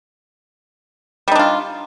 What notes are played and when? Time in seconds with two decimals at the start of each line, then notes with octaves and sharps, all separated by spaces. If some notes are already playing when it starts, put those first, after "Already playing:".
1.28 G3
1.32 D#4
1.35 D4
1.39 F4